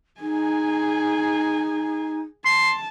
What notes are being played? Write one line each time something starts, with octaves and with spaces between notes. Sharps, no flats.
D#4 G#4 G#5
A5 C6